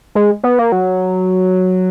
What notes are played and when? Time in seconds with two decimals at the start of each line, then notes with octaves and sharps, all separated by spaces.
0.15 G#3
0.43 B3
0.58 A#3
0.72 F#3